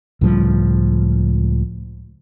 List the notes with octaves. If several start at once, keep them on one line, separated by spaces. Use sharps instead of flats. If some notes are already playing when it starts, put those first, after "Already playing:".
C#2 A2 F3 G3